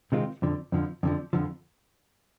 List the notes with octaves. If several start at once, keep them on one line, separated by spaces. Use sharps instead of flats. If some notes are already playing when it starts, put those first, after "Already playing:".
C3 D#3 G#3 C4 F4
F2 D3 F3
F2 D3 F3
F2 D3 F3
F2 D3 F3